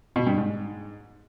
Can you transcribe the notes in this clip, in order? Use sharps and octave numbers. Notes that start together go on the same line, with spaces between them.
B2
G2
G#2